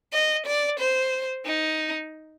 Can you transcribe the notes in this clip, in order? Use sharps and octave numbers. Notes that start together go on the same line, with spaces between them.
D#5
D5
C5
D#4